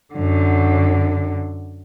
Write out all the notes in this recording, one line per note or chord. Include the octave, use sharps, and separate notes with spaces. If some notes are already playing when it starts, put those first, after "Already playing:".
F#2 D3